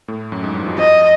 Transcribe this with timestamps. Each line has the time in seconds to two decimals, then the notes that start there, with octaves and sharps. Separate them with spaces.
0.08 A2 A3
0.32 F#2 F#3
0.43 G#2 G#3
0.55 G2 G3
0.62 E3
0.67 F2 F3
0.78 F2 F3 D#5